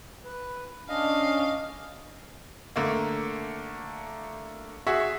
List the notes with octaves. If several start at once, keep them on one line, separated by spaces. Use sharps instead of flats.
B4
C#4 D4 D#5 F5
D3 A3 A#3
F#4 G#4 E5 C#6